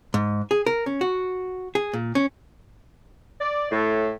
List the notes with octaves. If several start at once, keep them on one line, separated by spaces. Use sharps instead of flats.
G#2
G#4
A#4
C#4
F#4
G#4
A#2
C#4
D5
A2